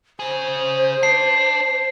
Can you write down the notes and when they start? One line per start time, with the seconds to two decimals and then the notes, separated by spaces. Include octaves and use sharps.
0.20 C#3 G#4 C5
1.03 D4 C7